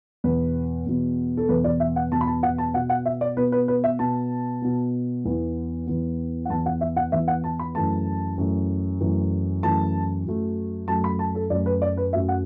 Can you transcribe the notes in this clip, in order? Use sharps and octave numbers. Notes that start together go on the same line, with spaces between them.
E2 B2 B3 B4
E2 B2 B3
A4
E2 B2 B3 B4
D5
E5
F#5
E2 B2 B3 A5
B5
A5
F#5
A5
B2 B3 F#5
F#5
E5
D5
B2 B3 B4
B4
B4
E5
B2 B3 A5
B2 B3
E2 E3 B3
E2 E3 B3
F#5
E2 E3 B3 A5
F#5
E5
F#5
E2 E3 B3 E5
F#5
A5
B5
F#2 E3 A3 A5
F#2 E3 A3
F#2 E3 A3
F#2 E3 A3 A5
F#2 F#3 A3
F#2 F#3 A3 A5
B5
A5
A4
F#2 F#3 A3 D5
B4
D5
B4
F#2 F#3 A3 E5
F#5